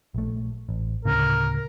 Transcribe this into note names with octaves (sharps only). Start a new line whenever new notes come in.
A#1 A3
A1
D2 A2 C#3 A#4